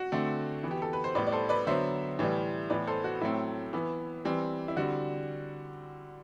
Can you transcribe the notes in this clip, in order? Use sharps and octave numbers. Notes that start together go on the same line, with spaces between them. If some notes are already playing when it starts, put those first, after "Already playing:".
Already playing: F#4
D3 A3 C4
E3 B3
G4
A4
B4
C5
A2 G3 B3 B4 D5
D5
A4 C5
B4 D5
D3 F#3 B3 C5 E5
A2 E3 G3
A2 E3 B3 B4 D5
A4 C5
F#4
A2 F#3 A3 C4 E4
E3 B3
E3 G3 C4
E4
D3 G3 C4 F#4